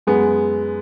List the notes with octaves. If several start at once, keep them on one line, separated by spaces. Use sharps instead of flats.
F#2 G#3 B3